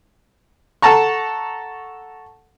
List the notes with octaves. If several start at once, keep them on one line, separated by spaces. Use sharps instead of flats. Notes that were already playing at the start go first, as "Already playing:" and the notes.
A4 F#5 A5 A#5 C#6